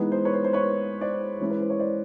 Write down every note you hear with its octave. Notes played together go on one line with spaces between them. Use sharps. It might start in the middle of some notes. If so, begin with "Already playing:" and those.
Already playing: E3 G#3 B3 D#4 B4
C5
B4 C#5
C5
C5
B4 C#5
C5 D5
E3 G#3 C#4 E4
B4
C5
C#5
C5 D5